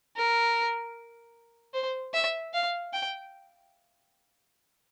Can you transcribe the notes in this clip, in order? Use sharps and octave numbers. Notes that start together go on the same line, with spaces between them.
A#4
C5
E5
F5
G5